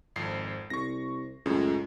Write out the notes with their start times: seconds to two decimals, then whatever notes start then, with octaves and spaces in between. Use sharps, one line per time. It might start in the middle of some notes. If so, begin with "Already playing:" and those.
0.16 G#1 F2 C7
0.70 C2 C#6 A#6
1.46 C#2 F#2 A2